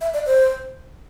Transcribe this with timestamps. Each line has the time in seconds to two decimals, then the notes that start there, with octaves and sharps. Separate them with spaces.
0.01 E5
0.14 D5
0.26 C5